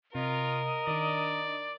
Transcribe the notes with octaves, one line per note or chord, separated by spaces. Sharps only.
C3 F4 A#4 D#5
D#3 D4 D5